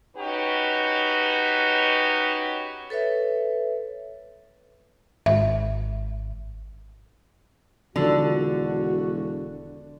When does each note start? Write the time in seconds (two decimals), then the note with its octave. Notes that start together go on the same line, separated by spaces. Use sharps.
0.16 C#4 D#4 F#4 G4 B4
2.90 A4 B4 C#5 E5
5.26 G#1 E5
7.96 E1 D3 D#3 F3 F#4 A4